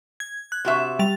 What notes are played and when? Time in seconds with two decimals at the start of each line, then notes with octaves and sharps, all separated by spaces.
0.20 G#6
0.52 F#6
0.65 C3 F#4 E5
0.99 G3 A6 F7